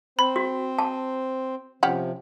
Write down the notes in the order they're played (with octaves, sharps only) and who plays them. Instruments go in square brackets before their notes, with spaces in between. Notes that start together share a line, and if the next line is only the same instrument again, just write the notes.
[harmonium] C4 C5 [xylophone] B5
[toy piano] F#4
A5
[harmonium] C3 F3 [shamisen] C#4 G4 F#5